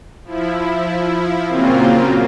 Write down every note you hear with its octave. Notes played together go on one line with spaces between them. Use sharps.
F3 E4
A#2 C#3 F#3 A#3 C4 F4